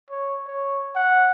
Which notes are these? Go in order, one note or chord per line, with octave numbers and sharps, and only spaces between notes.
C#5
C#5
F#5